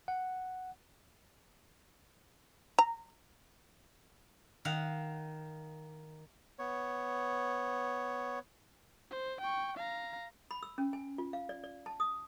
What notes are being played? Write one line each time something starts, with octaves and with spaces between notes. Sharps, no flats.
F#5
A#5
D#3 F5 F#5
B3 C#5
C5
G5 C#6
F5 A#5
B5
E6
C#4
G#5
F4
F5
D5
D5
A5
D#6